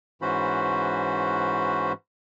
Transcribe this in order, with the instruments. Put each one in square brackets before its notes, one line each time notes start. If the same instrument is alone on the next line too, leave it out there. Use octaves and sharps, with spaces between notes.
[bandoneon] G#2 E3 C#4 F#4 C5 B5